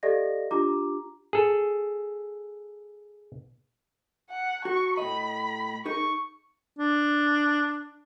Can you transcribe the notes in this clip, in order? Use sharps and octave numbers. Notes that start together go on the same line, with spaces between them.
G4 A4 D5 D#5 F5 A#6
D4 F4 G4 A#5 D6
G#4 A4
F#5
F#4 C#6
A2 D#5 B5
D#4 G#4 A#4 C#6
D4